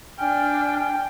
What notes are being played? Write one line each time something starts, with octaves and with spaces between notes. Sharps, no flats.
D4 G5 G#5 F6